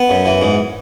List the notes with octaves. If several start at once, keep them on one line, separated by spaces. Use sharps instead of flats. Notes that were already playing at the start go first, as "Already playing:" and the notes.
Already playing: B3
F#2
E3
G#2